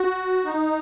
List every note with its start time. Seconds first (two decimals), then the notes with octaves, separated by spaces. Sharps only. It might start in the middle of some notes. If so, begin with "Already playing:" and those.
Already playing: F#4
0.45 D#4